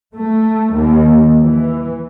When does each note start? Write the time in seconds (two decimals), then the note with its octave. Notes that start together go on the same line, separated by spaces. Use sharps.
0.14 A3
0.73 D#2
1.41 E3